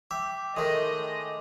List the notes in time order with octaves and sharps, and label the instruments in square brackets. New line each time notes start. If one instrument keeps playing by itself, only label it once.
[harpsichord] E5 [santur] G5 [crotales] D6
[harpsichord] A2 D#3 [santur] G#3 [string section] D#5 [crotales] D#6